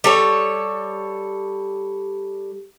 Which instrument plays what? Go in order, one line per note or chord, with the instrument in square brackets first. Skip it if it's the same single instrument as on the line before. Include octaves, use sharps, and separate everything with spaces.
[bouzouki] G3 A4 C#5